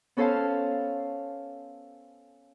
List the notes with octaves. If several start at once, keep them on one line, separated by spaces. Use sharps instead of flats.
B3 C#4 A4 C5 F5 A5